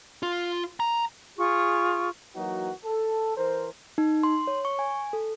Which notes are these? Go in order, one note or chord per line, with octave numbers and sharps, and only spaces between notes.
F4
A#5
F4 G#4 C#6
E3 F#3 A#3 D#4 F#4
A4
E3 A#4 C5
D#4
C6
C#5
C#6
G#5
A4